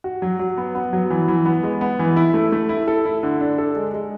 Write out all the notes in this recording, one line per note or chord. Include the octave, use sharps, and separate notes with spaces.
F#4
F#3
F#3
B3
B3
F#3
E3
E3
B3
G#3
B3
E3
E4
A3
A3
E4
A4
E4
D3
D4
A4
G#3
G#3